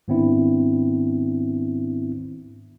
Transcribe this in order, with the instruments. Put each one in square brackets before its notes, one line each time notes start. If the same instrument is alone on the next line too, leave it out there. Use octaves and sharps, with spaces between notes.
[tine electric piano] G#2 D#3 B3 C4 D4 E4